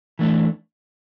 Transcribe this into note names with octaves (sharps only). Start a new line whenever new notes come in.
E3 A3 D4